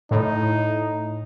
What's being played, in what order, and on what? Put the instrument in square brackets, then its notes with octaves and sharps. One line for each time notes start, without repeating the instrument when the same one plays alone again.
[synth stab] A2 [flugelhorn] D#4